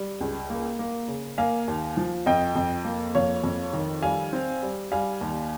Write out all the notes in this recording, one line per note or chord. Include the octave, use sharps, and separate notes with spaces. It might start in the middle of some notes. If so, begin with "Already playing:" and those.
Already playing: G3
C#2
A#3
A#3
C#3
A#3 F5 G#5
D#2
F3
F2 D#5 G5
F2
A#3
F2 C#5 F5
F2
D#3
G3 F5 G#5
C4
G3
G3 F5 G#5
D#2